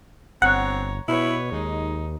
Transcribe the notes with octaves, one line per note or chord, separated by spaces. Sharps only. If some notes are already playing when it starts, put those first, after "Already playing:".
G1 C4 C#5 F#5 A#5
B2 E4 B4 C#5
D#2 G#3 D#4